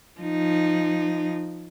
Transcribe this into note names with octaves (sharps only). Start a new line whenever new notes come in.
F3 D#4